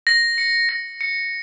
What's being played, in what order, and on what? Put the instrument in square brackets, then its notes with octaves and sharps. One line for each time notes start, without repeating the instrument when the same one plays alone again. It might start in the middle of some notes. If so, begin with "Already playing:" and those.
[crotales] A#6
C#7
A#6
C#7